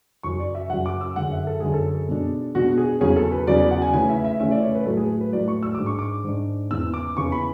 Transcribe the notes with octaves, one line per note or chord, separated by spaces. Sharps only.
F#2 C#3 F#3 C#6
D5
E5
F#2 C#3 F#3 F#5
D6
E6
F#2 D3 G#3 F#5
E5
A4
F#2 D3 G#3 G#4
A4
B2 G#3 D4
B2 G#3 D4 F#4
G#4
E2 C#3 F#3 C#4 G#4
A4
B4
E2 C#3 F#3 C#4 D5
D5
F#5
G#5
C#3 E3 A3 C#4 G#5
E5
E5
C#3 E3 A3 C#4 E5
D5
C#5
B4
A2 F#3 A3 A4
G#4
B4
A2 F#3 A3 D5
C#6
E6
G#2 G#3 D4 D6
C#6
D6
G#2 G#3 D4
E2 C#3 E3 E6
D6
E2 C#3 E3 C#6
B5